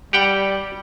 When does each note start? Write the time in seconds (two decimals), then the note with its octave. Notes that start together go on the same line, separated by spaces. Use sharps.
0.13 G3 G4 F#5 G5